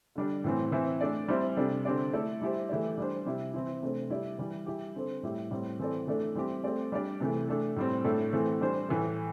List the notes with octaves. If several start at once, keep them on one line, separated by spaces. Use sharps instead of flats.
D3 G3 D4
A2 E3 C4
E3 C4 E4 C5
A3 D4 A4 D5
G3 C4 E4 C5
C3 G3 D4 A4
D3 C4 G4 D5
A3 E4 A4 D5
G3 E4 G4 C5
E3 A3 E4 G4 D5
G3 D4 C5
C3 G3 E4 G4
E3 C4 E4
C3 A3 D4 C5
G3 E4 G4 D5
E3 G3 E4
G3 E4 G4
D3 C4 A4 C5
A2 G3 E4 G4
A2 G3 C4
E3 C4 A4 D5
E3 A3 D4 A4 D5
G3 C4 E4 G4
A3 C4 G4 D5
G3 D4 G4 D5
C3 E3 A3
A3 D4 A4
A2 G3 C4
A2 A3 D4 A4
E3 A3 C4
G3 D4 C5
A2 E3 A3